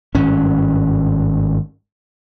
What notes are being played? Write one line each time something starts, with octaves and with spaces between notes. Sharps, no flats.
G#1 G2 C#4